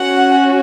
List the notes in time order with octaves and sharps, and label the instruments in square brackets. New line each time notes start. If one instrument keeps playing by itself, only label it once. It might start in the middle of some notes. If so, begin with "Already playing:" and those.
Already playing: [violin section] C#4 F#4 F#5